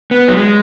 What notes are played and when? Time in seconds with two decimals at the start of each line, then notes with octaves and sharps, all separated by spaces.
0.11 B3
0.28 F#3
0.37 G#3